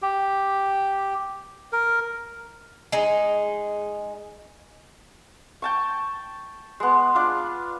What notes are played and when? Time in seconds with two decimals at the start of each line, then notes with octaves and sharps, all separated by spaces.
0.02 G4
1.73 A#4
2.92 G#3 D#4
5.62 G5 A5 C#6
6.80 G#3 B3
7.15 D4 F4